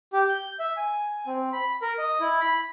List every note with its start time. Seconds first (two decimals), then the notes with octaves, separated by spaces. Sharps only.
0.13 G4
0.29 G6
0.59 E5
0.77 G#5
1.27 C4
1.53 B5
1.82 A#4
1.98 D#5
2.20 E4
2.41 B5